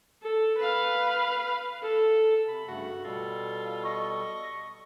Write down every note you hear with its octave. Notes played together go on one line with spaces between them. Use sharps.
A4
B4 F5
A4
C3 B5
G2 C#3 A3 F#4
B2 G3 F4 A4
D#5 C#6